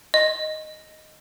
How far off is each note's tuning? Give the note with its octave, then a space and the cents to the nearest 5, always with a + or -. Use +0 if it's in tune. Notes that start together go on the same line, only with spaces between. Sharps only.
D#5 +0